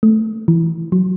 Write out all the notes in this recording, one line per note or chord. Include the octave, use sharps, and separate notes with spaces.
A3
E3
F#3